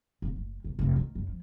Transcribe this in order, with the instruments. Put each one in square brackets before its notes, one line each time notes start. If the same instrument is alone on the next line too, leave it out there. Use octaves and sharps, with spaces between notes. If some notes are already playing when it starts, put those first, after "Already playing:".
[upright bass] D1
F#1
G1
F1
D#3
F#2
F3